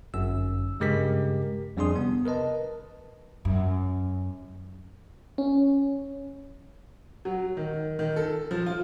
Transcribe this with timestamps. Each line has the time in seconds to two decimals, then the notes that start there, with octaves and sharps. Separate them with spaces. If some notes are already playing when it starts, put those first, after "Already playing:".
0.14 G1 F#2 E6
0.80 G2 C#3 G#3 G4 A#4 B6
1.77 F2 G3 D4 G#4 C6 D#6
1.96 C3 B3
2.26 A#4 B4 D#5 A5
3.45 F#2
5.38 C#4
7.25 F#3
7.57 D#3
7.99 D#3
8.16 A4
8.51 F3
8.66 F4